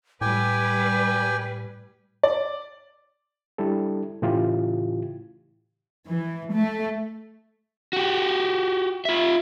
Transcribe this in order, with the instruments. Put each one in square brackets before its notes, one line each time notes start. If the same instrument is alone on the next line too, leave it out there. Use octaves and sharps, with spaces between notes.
[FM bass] A2 [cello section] G3 B4 [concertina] G5 G#5 [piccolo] D6
[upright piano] D5
[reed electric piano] G3 D4 E4 A4
A2 C#3 E3 E4 F4 G4
[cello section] E3
A3
[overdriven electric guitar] F#4 G4
F4 E5